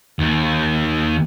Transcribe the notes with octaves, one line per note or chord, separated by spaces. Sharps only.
D#2